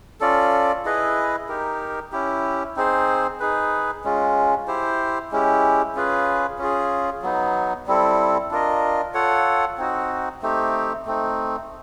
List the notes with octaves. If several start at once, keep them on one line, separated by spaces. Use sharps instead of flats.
C#4 F4 A4 D5
E4 G#4 B4 D#5
D#4 G4 A#4
C#4 E4 G4
C4 D#4 G#4 C5
D#4 G#4 B4
G#3 C#4 F4
E4 G4 C5
G#3 C#4 E4 G4
C#4 F4 G#4 B4
C#4 F4 G#4
F#3 B3 D#4
G3 C4 E4 A4
D4 F4 A#4 D#5
F4 A4 C#5 F#5
C4 D#4 F#4
A3 C4 D#4 G4
A3 C4 D#4